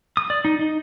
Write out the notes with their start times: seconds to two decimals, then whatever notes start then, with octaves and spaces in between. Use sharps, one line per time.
0.17 D#6
0.30 D5
0.45 D#4
0.59 D#4